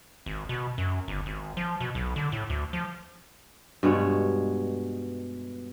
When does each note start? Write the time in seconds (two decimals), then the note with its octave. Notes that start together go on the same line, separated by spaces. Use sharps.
0.26 G#1
0.49 B2
0.78 F#2
1.08 G1
1.26 G#1
1.57 F3
1.81 B2
1.95 B1
2.16 D3
2.32 A2
2.50 D2
2.73 F3
3.83 G2 B2 G#3 C#5